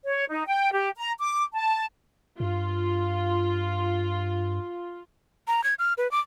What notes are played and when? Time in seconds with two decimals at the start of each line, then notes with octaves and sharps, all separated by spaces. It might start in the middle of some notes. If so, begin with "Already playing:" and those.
0.04 C#5
0.30 D#4
0.47 G5
0.72 G4
0.96 A#5
1.19 D6
1.53 A5
2.40 G2 F4
5.48 A#5
5.64 G#6
5.79 F6
5.98 B4
6.11 D6